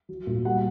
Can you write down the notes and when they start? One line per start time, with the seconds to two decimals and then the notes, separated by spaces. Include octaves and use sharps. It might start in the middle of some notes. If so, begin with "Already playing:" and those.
0.09 F#3
0.27 A#2
0.45 G3 F#5